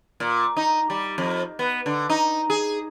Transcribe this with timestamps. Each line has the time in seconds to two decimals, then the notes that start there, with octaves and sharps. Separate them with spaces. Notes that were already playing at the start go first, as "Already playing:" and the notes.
0.20 A#2
0.57 D#4
0.90 G3
1.18 F2
1.59 B3
1.86 D3
2.10 D#4
2.50 G#4